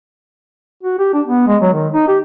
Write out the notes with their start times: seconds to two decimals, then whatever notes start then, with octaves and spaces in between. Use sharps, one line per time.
0.83 F#4
0.99 G4
1.14 D4
1.27 B3
1.47 G#3
1.62 F#3
1.73 D#3
1.93 D#4
2.08 G4